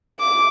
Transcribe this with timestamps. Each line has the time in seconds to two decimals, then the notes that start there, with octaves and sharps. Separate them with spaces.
0.20 D6